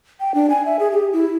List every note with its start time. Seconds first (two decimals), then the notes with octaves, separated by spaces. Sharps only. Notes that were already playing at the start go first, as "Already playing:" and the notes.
0.20 G5
0.34 D4
0.50 G#5
0.65 E5
0.79 G#4
0.92 G4
1.13 E4